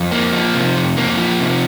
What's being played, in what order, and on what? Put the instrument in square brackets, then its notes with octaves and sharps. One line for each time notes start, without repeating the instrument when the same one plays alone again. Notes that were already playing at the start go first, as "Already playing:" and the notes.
Already playing: [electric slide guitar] F2
A#3
F3
C3
F2
A#3
F3
C3